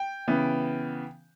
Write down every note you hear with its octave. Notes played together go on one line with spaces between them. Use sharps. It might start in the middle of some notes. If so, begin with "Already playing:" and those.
Already playing: G5
C#3 E3 B3